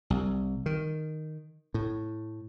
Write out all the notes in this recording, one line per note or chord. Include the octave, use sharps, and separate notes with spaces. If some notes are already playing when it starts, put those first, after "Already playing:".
C2
D#3
A2